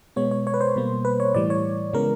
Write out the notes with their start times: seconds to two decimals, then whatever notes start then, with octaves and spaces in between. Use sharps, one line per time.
0.16 B2 G#3 B3 C#5
0.31 C#5
0.47 C#5
0.54 B4
0.61 C5
0.76 B2 G3 A#3
1.05 B4
1.20 C#5
1.35 A2 E3 G3 D5
1.50 C#5
1.93 C#3 E3 G#3 B3 A#4